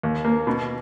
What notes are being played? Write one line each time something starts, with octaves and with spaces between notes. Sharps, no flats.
D#2
A#3
B2